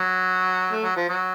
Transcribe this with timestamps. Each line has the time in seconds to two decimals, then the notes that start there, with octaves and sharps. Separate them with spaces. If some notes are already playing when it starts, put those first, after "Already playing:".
Already playing: F#3
0.71 A3
0.83 F#3
0.96 F3
1.09 F#3